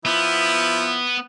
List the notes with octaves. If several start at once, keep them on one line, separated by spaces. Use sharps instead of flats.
F3 B3 E4